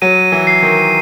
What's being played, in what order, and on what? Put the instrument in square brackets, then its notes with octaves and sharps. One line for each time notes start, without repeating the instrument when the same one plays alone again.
[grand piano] F#3 [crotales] D#7
[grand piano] E3
[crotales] C7
[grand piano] D#3